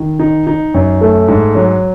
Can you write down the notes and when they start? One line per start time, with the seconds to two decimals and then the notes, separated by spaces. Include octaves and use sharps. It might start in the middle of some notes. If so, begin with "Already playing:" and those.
Already playing: D#3
0.19 D#4
0.47 D#4
0.74 F#2
1.01 A3
1.28 G#2
1.55 F#3